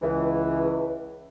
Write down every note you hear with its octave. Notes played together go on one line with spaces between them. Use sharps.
C#2 E3